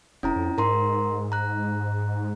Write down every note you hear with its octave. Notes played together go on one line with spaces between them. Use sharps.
F1 C#4 E4 A#5
F2
G#2 A#4 A#5 C6
A#5 F#6